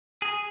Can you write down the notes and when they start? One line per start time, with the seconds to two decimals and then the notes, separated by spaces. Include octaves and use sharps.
0.22 G#4